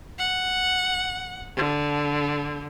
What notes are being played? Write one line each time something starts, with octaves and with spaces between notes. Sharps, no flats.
F#5
D3